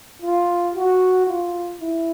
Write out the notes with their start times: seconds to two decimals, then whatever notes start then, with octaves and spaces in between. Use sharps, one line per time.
0.22 F4
0.75 F#4
1.27 F4
1.81 E4